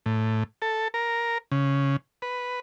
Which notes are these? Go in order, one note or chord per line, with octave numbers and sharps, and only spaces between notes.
A2
A4
A#4
C#3
B4